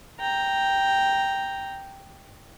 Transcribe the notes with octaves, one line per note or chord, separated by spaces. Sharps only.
G5 A#5